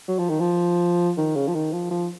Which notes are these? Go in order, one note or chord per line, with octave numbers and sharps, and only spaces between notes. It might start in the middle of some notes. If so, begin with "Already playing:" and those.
F#3
F3
D#3
F3
D#3
C#3
F3
D#3
F3
F3